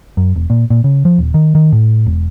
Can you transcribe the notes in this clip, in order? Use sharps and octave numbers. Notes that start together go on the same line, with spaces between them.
F#2
E1
A#2
A#2
C#3
F3
D#1
D#3
D#3
A2
E1